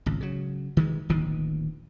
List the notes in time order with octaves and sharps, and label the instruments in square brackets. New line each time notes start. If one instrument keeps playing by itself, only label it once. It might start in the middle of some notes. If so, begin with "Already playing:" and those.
[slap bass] G#1 C#2
C#3 F#3
D#3 E3 G#3
D1 A#1 B2 D#3